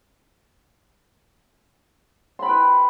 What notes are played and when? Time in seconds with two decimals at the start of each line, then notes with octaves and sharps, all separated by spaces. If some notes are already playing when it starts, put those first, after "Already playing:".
2.39 C6
2.42 B5
2.46 G5
2.49 B4